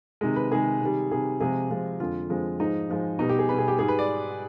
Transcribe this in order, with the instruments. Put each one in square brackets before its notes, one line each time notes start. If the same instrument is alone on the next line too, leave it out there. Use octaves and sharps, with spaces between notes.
[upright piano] C3 D#3 G#3
B4
C3 D#3 G#3 G#4
C3 D#3 G3
C3 D#3 G3 G#4
C3 F3 G#3 G#4
C3 F3 G#3
F2 D3 F3 G#3 F4
F2 D3 F3 G#3
G#2 F3 G#3 D#4
G#2 F3 G#3
B2 G3 D#4
G4
G#4
B2 G3 B4
G#4
G4
G#2 G3 G#4
B4
D5